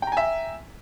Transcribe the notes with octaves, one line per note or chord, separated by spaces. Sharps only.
E5 G5 G#5 A#5